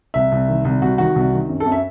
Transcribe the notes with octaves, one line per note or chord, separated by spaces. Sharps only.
C2 E5
C2
D#3
C2
C2 F#4
D#3 F#4
C2
D#3
F#2
A4
F#2
E5